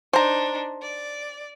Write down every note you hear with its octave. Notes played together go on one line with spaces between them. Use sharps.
D4 D#4 C5 A#5
D5